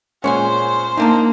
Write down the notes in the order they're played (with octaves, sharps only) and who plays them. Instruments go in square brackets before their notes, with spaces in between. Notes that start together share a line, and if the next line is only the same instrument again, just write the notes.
[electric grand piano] A#2 G#3 C#4 [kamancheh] C5 [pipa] C#5 F#5 G#5
[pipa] D3 D4 A5 [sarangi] A#3 [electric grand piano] D#4